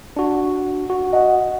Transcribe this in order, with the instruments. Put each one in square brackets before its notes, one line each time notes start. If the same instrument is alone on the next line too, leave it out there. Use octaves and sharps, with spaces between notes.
[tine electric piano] D4 F#4
F#4
[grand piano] D#5 F#5